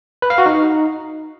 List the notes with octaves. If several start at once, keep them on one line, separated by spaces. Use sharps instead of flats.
B4
F5
F#4
D#4